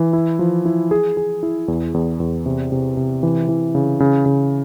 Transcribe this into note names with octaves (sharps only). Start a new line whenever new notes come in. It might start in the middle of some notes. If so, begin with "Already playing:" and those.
Already playing: E3
E4
F3
E4
G#4
G#4
E4
E2
E2
E2
C3
C3
C3
E3
E3
C#3
C#3
C#3